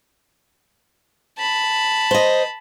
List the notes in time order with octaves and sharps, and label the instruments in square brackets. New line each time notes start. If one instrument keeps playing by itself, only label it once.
[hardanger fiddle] A5 B5
[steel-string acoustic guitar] C5 D#5